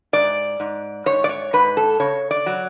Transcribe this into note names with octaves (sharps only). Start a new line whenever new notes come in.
G#2 D5
G#2
G#2 C#5
D5
C#5
G#2 B4
A4
C#3 C#5
D5
F#3